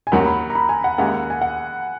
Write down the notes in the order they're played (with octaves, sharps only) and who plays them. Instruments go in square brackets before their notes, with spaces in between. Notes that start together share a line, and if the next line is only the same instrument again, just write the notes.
[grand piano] G#5
[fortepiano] D#2 D#3 F#3 C#4 F#4 [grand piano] A#5
[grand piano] B5
A#5
B5
G#5
F#5
[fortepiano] D#2 C#3 G#3 [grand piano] F#5
[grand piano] G#5
F#5